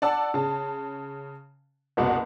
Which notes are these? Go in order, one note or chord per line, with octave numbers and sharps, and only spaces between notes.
D5 F#5 A5 E6
C#3 A5
F#1 C2 B2 F#4